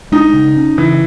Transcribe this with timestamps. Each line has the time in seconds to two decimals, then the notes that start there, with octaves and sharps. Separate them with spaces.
0.12 G#3 D#4
0.34 C#3
0.56 C#4
0.78 C#3 E3